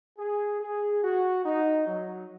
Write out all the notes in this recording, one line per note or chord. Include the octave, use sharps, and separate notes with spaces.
G#4
G#4
F#4
D#4
F#3